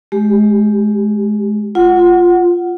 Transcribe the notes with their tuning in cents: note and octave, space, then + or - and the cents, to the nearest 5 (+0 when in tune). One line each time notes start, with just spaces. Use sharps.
G#3 +25 G4 +0
F4 +0 F#5 +0